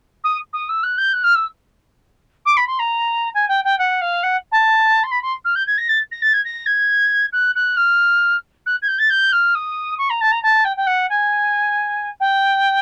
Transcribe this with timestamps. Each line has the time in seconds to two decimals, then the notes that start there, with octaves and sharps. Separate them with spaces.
0.24 D#6
0.53 D#6
0.68 E6
0.83 F#6
0.97 G6
1.13 F#6
1.23 F6
1.35 E6
2.45 D6
2.56 B5
2.67 C6
2.79 A#5
3.34 G#5
3.48 G5
3.64 G5
3.78 F#5
4.01 F5
4.23 F#5
4.51 A5
5.03 C6
5.11 B5
5.22 C6
5.44 F6
5.55 G6
5.66 G#6
5.77 A#6
5.88 A6
6.11 A#6
6.22 A6
6.33 G#6
6.44 A#6
6.66 G#6
7.32 F#6
7.55 F#6
7.76 F6
8.66 F#6
8.82 G#6
8.87 G6
8.98 A6
9.10 G6
9.32 F6
9.54 D#6
9.98 C#6
10.09 A#5
10.21 A5
10.31 A#5
10.42 A5
10.64 G5
10.76 G5
10.86 F#5
11.09 G#5
12.20 G5